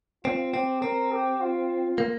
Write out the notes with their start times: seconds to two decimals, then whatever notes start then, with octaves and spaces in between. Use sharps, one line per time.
0.25 C4 F4
0.54 C4 G4
0.82 C4 A#4
1.12 G4
1.41 F4
1.98 A#3